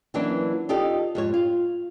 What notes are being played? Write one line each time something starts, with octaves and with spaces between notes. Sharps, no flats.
E3 F#3 A#3 C#4 D4 E4
D#4 F4 G4 A4 D5 D#5
F2 G#2 C#5
F4